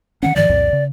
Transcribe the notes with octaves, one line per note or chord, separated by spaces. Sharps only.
D#3 A#3 C#4 F#5
G#2 D#3 F3 D5
C2 F2 A#2
C#3